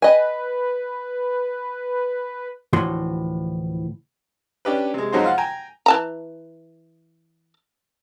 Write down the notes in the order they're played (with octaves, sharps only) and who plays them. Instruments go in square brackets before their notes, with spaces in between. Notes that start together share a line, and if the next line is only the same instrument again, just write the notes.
[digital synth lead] B4 [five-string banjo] D#5 G#5
[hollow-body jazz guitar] D2 A2 E3 F3 F#4 C6
[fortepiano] C#4 D4 G4 B4
C3 G#3
F2 F#3 G#3 D#4 F#4 C5
F4 F5 F#5
G5 G#5 A#5
[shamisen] E3 A5 A#5